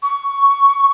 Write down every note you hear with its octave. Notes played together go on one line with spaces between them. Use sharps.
C#6